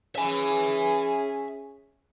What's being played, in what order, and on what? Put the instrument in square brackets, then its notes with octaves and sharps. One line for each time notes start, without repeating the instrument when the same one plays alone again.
[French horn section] C#4 G#4 [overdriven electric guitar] E5 G#5